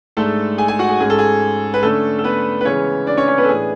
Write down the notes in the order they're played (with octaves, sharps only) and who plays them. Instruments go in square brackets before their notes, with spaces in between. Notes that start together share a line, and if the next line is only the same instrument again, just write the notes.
[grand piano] G#2 G#3 A3 D4 A4
G#4 G#5
G#4 G#5
F#4 F#5
G#4
G#2 G#3 C#4 G#4
A4
G#4
B4
D3 A3 C#4 A4
A4
B3 B4
B4
C#3 E3 G#3 B3 C#4 C#5
D4 D5
C#4 C#5
C#4 C#5
B3 B4
A4
A2 E3 B3 D4 G#4